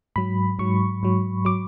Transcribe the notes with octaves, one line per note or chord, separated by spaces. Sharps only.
G#2 F#3 B5
G#2 F#3 C#6
G#2 F#3
F#3 D6